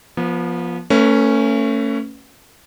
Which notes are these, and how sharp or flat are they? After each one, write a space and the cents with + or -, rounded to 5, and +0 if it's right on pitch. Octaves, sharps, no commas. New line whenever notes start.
F3 +0 B3 -35
A3 +35 C#4 -5 B4 +0